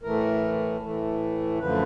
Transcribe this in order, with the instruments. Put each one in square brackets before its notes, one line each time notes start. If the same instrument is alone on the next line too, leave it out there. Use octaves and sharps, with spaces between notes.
[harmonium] A2 E3 A3 A#4
A2 E3 A3
F#2 D3 F3 A3 B4